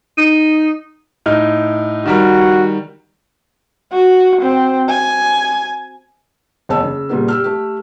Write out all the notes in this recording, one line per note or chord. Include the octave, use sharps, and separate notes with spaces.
D#4
A2 D#4 F6
D#3 G3 F#4 A#4
F#4
C4
G#5
F#1 E2 C#5 A5 E6
C#3
A#2 C#3 G3 A#3 B3
G4 E6 F6
A3 G4